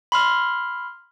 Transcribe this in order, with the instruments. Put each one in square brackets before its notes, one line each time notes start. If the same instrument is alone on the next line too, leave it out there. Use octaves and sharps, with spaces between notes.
[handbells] B5 C6 F6